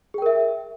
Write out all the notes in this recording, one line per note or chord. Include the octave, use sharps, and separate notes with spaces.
G#4 A#4 E5 G5